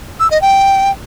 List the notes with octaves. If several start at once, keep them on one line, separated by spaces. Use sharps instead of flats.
E6
D#5
G5